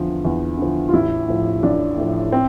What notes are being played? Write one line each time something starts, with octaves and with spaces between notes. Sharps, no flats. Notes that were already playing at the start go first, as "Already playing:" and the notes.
Already playing: E2 D3 F3
E2
D3 F3
F4
A1 E4
A2 F3
A1 D4
A2 F3
C4